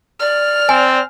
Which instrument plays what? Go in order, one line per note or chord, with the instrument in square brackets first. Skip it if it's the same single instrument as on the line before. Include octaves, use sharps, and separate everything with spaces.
[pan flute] D5 [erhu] F6
[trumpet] C4 [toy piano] G#5